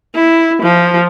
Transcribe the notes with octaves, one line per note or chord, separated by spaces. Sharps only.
E4
F3